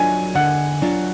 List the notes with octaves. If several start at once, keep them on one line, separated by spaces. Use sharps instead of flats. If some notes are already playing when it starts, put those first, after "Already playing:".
Already playing: F#3 D4 F4 G#5
D3 F#5
F#3 D4 F4